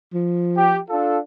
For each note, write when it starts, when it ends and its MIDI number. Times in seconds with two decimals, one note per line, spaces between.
0.14 0.82 53
0.57 0.77 67
0.89 1.18 62
0.89 1.18 65
0.89 1.18 69